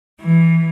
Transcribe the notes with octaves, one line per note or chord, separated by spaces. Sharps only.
E3